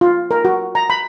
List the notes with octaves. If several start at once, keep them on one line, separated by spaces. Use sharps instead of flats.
F4
A#4
F#4
A#5
B5